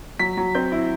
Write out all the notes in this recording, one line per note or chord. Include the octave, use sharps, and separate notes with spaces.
F#3 B6
F#3
C4 G6
E4